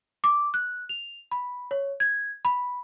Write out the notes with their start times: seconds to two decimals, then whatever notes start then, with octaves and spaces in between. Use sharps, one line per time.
0.24 D6
0.54 F#6
0.89 F7
1.31 B5
1.71 C#5
2.00 G#6
2.45 B5